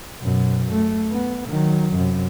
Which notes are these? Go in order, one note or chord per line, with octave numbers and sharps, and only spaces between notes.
F#2 B2
A3
B3
D#3 F#3
F#2 C3